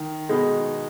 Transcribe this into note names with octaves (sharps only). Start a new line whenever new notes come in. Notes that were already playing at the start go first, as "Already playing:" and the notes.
Already playing: D#3
B2 G#3 D#4